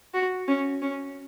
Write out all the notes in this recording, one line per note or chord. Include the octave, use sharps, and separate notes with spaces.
F#4
C#4
C#4